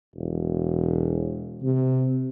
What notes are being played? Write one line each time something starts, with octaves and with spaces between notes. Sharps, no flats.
E1
C3